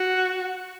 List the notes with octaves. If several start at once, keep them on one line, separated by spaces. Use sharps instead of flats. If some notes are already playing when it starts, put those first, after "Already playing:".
Already playing: F#4